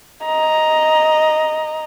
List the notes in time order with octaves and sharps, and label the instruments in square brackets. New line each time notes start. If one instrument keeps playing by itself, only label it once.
[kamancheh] D#5 A#5